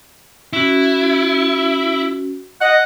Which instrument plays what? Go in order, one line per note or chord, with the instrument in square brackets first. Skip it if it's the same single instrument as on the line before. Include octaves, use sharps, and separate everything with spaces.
[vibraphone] C#4 F#4 [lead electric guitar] E4
[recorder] D#5 [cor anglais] F#5